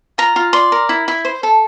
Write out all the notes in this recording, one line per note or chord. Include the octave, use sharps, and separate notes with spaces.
F4 A#5
F4
D5 C6
A#4
E4
E4
C5
A4